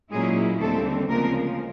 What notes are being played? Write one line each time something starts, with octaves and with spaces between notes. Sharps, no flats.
A#2 F#3 G#3 A#3 C#4 E4 G#4
D#2 D3 G3 A3 C4 A4
D2 C#3 F3 G#3 A#3 C4 A#4